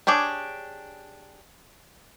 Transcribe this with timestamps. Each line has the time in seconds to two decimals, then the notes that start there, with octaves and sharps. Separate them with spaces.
0.07 D4 G4 G#4 C#5